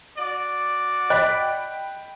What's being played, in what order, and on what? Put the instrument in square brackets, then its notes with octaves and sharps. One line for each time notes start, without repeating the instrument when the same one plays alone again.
[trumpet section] F#4 D5
[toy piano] D#5 [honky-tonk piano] G5 B5 B6 [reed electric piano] F#6